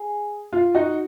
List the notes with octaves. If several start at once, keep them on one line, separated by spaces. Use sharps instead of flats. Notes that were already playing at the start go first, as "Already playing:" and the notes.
Already playing: G#4
F4
D#4 F#4